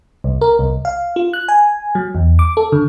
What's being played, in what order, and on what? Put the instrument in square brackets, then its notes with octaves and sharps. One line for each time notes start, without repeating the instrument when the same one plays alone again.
[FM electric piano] C2
A#4
C2
F5
F4
F#6
G#5
F#3
E2
D6
A4
D3